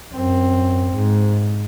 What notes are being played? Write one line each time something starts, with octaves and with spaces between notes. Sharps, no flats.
F#2 C4
G#2